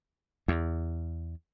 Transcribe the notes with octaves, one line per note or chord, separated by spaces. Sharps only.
E2